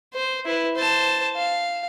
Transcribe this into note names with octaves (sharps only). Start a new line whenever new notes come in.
C5
E4 B4
C5 A5
F5